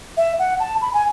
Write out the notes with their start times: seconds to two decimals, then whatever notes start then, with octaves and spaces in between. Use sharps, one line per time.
0.17 E5
0.39 F#5
0.60 A5
0.82 B5
0.94 G#5